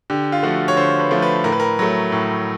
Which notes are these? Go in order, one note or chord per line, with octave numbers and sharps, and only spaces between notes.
D3 G4
F4
F3 A3 F#4
C#5
D3 C5
B4
F3 A3
B4
A2 A#4
B4
A#4
F#3 A3
A2